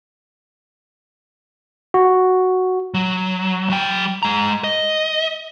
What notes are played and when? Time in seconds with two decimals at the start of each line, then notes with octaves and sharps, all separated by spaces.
1.94 F#4
2.94 F#3
3.70 F#3 G5
4.23 G#3 A#5
4.64 D#5